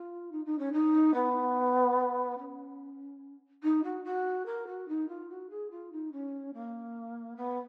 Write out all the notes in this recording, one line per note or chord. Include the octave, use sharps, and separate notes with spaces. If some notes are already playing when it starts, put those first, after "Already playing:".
Already playing: F4
D#4
D#4
C#4
D#4
B3
C#4
D#4
F#4
F#4
A#4
F#4
D#4
F4
F#4
G#4
F4
D#4
C#4
A#3
B3